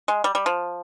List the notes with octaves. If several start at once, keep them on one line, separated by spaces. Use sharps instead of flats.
G#3
G3
G3
F3